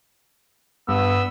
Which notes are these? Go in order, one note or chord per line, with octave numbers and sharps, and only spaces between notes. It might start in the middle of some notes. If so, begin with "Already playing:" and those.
G2 B3 E6